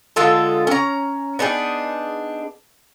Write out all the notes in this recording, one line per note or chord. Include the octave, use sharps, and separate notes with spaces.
D3 G#3 F4 A4
C#4 A#5
B3 D4 D#4 G#4